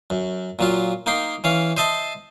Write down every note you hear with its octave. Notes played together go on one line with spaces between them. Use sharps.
F#2
A#2 F#3 F4
A#3 D#4 G5 C6
E3 C#4 F5
C5 D#5 E5 A5 C6